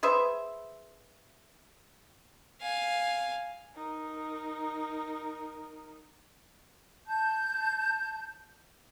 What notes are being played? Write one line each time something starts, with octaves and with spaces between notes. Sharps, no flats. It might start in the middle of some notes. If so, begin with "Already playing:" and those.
G#4 B4 C5 E5
F5 G#5
D#4 A#4
A5 G6